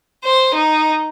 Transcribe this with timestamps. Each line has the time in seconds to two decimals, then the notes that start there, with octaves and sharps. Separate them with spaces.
0.24 C5
0.54 D#4